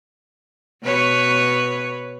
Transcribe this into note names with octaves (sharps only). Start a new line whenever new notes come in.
B2 B4 C#5